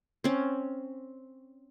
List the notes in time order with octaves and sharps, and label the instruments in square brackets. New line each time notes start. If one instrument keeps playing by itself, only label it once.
[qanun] C4 C#4